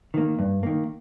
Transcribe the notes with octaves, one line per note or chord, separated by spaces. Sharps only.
D#3 A#3
G2
D#3 A#3